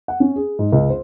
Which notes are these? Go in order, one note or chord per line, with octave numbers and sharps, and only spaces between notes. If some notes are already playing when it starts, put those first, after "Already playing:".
F#5
C#4
G#4
G#2
C#2
C5